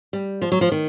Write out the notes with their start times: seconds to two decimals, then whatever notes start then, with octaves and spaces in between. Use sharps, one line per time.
0.13 G3
0.42 F3
0.52 F#3
0.61 F3
0.72 D#3